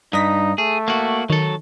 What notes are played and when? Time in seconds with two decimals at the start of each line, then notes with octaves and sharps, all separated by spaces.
0.13 G2 D#4 D#6 A#6 B6
0.58 A3 G#4
0.88 A#3 F#4
1.30 D#3 F#3 A4